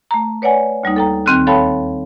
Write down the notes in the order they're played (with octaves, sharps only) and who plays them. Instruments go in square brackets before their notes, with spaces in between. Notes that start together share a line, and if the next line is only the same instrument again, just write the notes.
[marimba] A3 A#5
B4 C#5 D5 F#5 G#5
D2 G3 A#3 D#4
A4 G5 A#5
D#2 D#3 C4 F6 F#6
A4 C#5 F5 G5 A5 B5